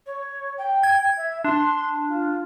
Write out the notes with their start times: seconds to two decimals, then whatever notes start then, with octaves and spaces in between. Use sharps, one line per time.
0.06 C#5
0.58 G5
0.83 G#6
1.17 E5
1.44 D4 C6
2.08 F4